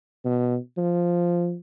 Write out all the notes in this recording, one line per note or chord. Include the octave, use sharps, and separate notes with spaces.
B2
F3